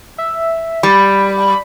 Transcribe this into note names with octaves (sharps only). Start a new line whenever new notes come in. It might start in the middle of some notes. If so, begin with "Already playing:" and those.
E5
G3 B5